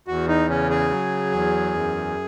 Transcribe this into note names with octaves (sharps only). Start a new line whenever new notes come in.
E2 F#4
D#4
C#3 C#4
G#4
F#3
E2
F#2